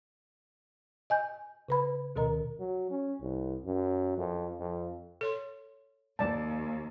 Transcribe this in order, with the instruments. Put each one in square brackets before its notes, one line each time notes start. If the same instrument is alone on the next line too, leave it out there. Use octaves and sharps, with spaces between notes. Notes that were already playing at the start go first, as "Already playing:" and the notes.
[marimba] D#5 G#5 G6
C#3 B4 B5
D2 B2 D#3 A#4 D#5 A#5
[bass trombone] F#3
C#4
C2
F#2
F2
F2
[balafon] A4 C#5 C6
[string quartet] D#2 [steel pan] D5 A5